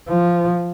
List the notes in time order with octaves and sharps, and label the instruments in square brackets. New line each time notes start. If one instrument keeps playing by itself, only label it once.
[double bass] F3